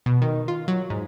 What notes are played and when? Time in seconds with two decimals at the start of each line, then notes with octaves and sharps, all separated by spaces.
0.06 B2
0.22 D#3
0.48 F4
0.68 F#3
0.90 G#2